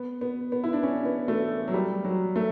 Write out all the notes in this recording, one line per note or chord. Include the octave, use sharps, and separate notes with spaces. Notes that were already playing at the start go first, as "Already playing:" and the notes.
Already playing: B3
B3
B3
E4
D4
C#4
B3
A3
F#3
G3
F#3
A3